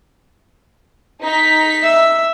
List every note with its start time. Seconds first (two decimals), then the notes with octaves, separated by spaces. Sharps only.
1.22 D#4 B6
1.83 E5